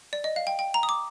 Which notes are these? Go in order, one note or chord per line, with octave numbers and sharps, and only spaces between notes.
D5
D#5
F5
G5
G5
A#5
D#6
D6